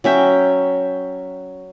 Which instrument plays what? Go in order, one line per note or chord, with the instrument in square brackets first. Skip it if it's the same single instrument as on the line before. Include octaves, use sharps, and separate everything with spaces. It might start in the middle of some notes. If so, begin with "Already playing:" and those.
[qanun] F#3 C#4 E5 G5